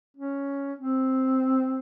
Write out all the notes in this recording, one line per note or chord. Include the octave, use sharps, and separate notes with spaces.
C#4
C4